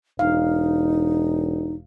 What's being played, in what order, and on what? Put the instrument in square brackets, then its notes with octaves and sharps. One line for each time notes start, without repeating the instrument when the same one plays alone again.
[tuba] E1 [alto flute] D#4 [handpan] F5